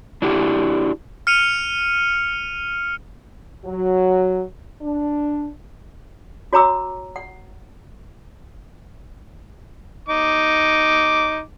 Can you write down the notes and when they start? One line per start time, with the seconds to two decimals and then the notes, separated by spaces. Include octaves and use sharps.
0.22 D4 E4 F#4 G4 F5 F#5
1.27 F6 C#7 D#7 F7
3.64 F#3
4.82 D4
6.53 F#4 C#5 G#5 A#5 D6 E6
7.16 F#5
10.09 D#4 D6